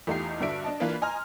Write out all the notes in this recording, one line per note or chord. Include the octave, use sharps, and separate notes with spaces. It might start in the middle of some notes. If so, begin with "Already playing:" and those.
E2 A3 D#4 F4 G4 C7
G2 D3 F#4 D5 E5 D7
D4 D#5 A5
E3 A#3 D4 F4 B4
D#5 G#5 A#5 C6 F6